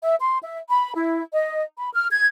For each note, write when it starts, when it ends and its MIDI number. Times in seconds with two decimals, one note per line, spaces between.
0.04 0.15 76
0.21 0.38 84
0.43 0.59 76
0.70 0.92 83
0.94 1.22 64
1.33 1.62 75
1.78 1.89 83
1.94 2.08 89
2.12 2.27 92